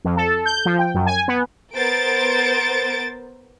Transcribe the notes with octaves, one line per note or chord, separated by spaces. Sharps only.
F2
A4
G6
F3
G5
F#2
G#5
B3
B3 A#4 C5 A6 D7